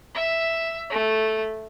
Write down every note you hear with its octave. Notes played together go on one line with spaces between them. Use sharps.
E5
A3